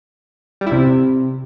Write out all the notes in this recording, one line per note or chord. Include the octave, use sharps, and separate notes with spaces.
G3
E4
C3